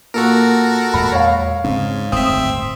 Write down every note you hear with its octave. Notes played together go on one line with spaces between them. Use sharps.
A#2 F#4 A4 A#4
E2 A#2 G#3 B5
C#5 F5
G#2 C#3 C4 C#4
D1 G1 A2 C4 E5 D#6